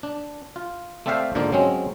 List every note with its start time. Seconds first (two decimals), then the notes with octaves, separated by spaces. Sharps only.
0.03 D4
0.56 F4
1.06 A3 C4 D5 E5 F5 G5
1.35 G#2 D3 A#3 D4 F4
1.52 F#3 G#3 C4 C#4